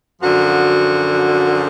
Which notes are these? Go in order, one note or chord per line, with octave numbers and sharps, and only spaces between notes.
F#2 D3 F3 F#4